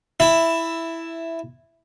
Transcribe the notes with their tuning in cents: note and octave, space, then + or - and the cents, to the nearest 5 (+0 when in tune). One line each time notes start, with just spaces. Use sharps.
E4 +0 E5 +5 A5 +30